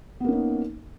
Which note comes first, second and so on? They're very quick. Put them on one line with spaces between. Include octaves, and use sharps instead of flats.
B3 A#3 C#4 D#4